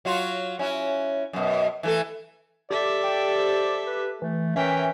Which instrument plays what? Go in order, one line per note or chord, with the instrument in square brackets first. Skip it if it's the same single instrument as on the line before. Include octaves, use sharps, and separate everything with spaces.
[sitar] F#3 F4 F#4
C#4 E4 F#4
F#2 B2
E3 A3 A4
[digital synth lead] G4 [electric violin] A4 E5 [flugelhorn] D5
[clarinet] G5
C5
B4
[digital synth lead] E3 [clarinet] A3
[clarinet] E3 [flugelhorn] C#4 [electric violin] A#4 G5 [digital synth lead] E5